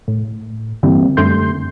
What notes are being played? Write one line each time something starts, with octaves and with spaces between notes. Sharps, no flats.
A2
G2 D3 E3 G3 A#3 C4
F#2 D3 G3 A3 C6 G6